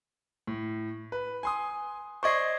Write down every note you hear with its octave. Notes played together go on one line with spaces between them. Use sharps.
A2
B4
G#5 C6 D#6
C5 D5 D#5 C#6 G#6 C7